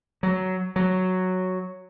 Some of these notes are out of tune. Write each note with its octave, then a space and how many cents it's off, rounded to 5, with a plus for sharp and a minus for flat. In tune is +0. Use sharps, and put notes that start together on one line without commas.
F#3 +10
F#3 +0